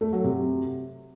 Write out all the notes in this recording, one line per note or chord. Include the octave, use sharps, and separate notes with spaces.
A3
F#3
C3